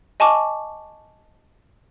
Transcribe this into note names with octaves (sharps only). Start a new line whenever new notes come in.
D#5 G#5 A5 C#6 D6